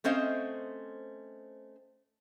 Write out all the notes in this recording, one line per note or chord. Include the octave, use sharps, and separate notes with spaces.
A3 C4 C#4 C5 D#5 F5